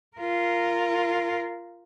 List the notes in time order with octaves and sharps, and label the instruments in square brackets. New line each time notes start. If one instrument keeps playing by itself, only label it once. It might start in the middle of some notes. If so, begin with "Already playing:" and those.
[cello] F4 A#4